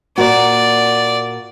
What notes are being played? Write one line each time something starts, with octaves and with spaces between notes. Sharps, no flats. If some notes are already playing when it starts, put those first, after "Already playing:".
A#2 A#3 F#4 D5